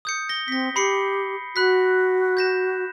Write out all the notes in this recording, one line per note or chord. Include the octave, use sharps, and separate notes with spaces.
D#6 G6 C#7
A#6 G7
C4 A#6 B6
G4 B5 C7 C#7
F#4 B5 F#6 B6
G6 A#6 E7